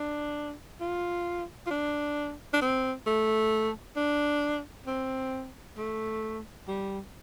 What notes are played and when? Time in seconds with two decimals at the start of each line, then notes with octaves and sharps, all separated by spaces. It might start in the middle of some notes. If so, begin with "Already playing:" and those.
Already playing: D4
0.81 F4
1.67 F4
1.71 D4
2.53 D4
2.62 C4
3.06 A3
3.97 D4
4.87 C4
5.77 A3
6.68 G3